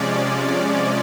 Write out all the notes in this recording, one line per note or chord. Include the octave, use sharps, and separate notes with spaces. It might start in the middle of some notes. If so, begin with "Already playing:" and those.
Already playing: C3 F3 G#3 C#4 D5